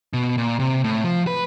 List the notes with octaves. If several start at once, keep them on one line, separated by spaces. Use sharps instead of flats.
B2
A#2
C3
A2
F3
B4